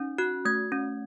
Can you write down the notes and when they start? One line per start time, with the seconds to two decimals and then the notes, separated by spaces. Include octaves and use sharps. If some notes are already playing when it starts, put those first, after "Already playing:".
Already playing: C#4 D#4
0.18 F#4 F#6
0.45 A3 G#6
0.72 C#4